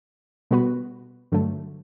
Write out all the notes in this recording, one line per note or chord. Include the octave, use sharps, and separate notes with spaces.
B2 G3 B3 F#4 B4
G2 D3 F#3 A3